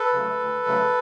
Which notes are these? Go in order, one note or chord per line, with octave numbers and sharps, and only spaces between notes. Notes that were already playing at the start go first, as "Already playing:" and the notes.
Already playing: A4 B4
C#3 F#3 A3
D2
C#3 F#3 A3